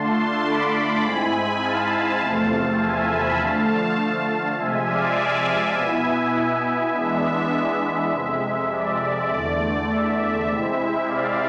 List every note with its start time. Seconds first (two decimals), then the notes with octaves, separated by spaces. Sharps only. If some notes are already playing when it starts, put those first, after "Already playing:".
Already playing: D3 A3 D4 F4 A5 C6
0.43 B5 D6
1.01 G#2 G#3 C4 E4 G#5 B5
1.61 F5 A5
2.20 E2 C3 F3 A3 C4
2.78 E5 G#5
3.08 G#5 B5
3.38 D3 F3 A3 F5 A5
4.56 C3 F3 G#3 E5 G#5
4.86 D5 F5
5.15 E5 G#5
5.74 B2 B3 E4
6.92 E3 G#3 B3 D4 E5
8.11 F2 C3 G#3
8.70 D5
9.29 E2 D3 A3 D5
9.88 E5
10.47 C3 G#3 C4 E4 E5
11.05 D5 F5